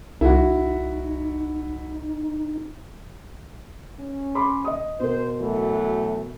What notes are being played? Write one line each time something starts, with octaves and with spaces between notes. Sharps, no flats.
C2 D#4 E4 F#4
C#4
B5 C6 D6
D#5 D#6
B2 A#4 C5
E3 F#3 A3